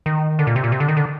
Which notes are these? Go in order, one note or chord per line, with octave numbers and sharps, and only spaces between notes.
D#3
D3
A#2
C3
A#2
C3
D3
D#3
D3